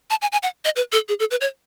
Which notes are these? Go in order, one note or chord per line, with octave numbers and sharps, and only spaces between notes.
A5
G#5
G#5
F#5
D#5
B4
A4
G#4
A4
B4
C#5